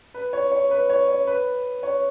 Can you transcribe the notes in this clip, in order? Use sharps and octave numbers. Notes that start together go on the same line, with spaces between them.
B4
C#5
C#5
B4
C#5
C#5
B4
C#5